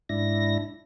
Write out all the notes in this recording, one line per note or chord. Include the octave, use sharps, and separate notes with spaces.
G#2 D4 E4 A#6